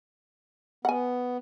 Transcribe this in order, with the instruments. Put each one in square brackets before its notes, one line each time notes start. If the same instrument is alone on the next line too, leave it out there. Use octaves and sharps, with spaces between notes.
[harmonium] B3 [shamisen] F#5 G#5